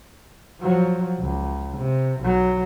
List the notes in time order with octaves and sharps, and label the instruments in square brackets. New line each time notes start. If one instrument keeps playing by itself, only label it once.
[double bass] F3 F#3
C#2
C3
B1 F#3